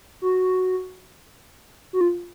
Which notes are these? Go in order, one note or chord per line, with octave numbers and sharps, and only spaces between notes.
F#4
F#4
F4